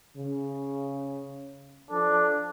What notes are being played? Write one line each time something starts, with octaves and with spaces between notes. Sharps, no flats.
C#3
F3 D4 A4